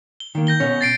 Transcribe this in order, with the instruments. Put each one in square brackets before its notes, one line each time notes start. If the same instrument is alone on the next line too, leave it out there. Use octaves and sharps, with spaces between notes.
[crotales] G7
[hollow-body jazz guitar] D#3 A#3
[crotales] G6 A#6 G7
[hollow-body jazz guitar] B2 C#4 C#5
[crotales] A6 C7 D7